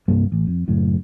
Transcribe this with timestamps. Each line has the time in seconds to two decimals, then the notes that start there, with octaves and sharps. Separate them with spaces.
0.08 C2 G2 G3 A#3
0.32 A1
0.47 F2
0.68 F#1 F#2 A2